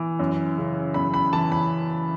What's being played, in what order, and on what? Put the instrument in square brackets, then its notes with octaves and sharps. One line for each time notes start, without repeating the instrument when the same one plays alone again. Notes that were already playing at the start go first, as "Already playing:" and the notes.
Already playing: [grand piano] E3
F#2
C#3
F#2 B5
B5
E3 A5
B5